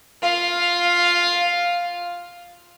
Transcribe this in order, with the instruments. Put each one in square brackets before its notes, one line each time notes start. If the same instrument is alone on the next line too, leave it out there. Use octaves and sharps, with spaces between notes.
[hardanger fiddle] F4 F5